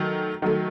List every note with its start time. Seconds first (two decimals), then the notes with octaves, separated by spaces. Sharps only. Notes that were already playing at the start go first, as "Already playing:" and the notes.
Already playing: D#3 F#3 A3
0.42 D#3 F#3 A3